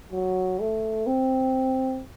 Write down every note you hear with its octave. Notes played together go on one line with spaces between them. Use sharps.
F#3
A3
C4